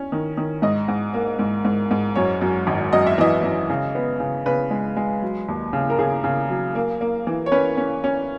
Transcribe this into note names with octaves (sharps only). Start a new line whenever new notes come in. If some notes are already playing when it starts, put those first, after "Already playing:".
Already playing: C#4
D#3
D#3
G#2 D#5
G#2
A#3
G#2
G#2
G#2
F#2 C#5
F#2
G#1
F#2 D#5
E5
E3 D#5
F#2
C#3
B3
C#3
C#3 B4
G#3
G#3
F#3
D#2
C#3
A#4
C#3 G#4
C#3
F#3
A#3
A#3
E3
C#5
C#4 B4
C#4
C#4